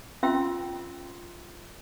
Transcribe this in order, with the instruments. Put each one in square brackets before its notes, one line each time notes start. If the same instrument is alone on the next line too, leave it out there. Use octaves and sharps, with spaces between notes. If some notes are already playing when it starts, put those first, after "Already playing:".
[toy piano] C#4 F4 E5 G5 C6 E6